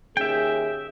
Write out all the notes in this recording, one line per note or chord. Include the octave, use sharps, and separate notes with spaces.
D#2 C#4 G#4 E5 G5